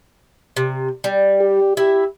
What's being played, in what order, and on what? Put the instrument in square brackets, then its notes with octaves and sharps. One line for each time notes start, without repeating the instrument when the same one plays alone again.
[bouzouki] C3
G3
[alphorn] G4
[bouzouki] E4 E5 [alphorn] G4